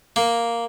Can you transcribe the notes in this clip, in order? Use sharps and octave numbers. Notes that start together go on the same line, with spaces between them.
A#3